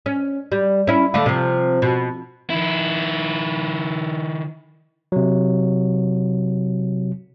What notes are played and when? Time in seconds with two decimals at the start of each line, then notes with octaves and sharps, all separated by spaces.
0.06 C#4
0.52 G3
0.87 C#4 E4
1.14 D3 A3 F4
1.26 C3 F3
1.82 B2
2.50 D#3 E4
5.12 C3 F#3